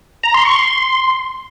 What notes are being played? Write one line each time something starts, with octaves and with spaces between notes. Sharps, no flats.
A#5
C6
C#6
C6